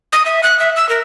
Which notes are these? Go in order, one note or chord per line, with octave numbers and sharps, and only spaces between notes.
D#6
E5
F#6
E5
E6
A#4